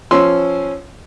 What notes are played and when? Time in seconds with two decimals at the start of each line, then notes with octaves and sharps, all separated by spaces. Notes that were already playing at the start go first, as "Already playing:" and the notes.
0.11 F3 C#4 C6 E6